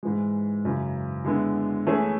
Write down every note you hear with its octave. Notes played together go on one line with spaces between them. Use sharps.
G#2 E3 G#3
F#2 C#3 E3
D3 G#3 B3 E4
E3 A3 C#4 G#4